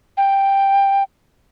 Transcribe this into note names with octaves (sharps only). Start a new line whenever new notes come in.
G5